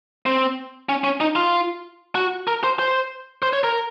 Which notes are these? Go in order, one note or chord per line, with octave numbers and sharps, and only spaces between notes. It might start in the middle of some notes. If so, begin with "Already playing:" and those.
C4
C#4
C#4
D#4
F4
F#4
A#4
C5
C5
C5
C#5
A#4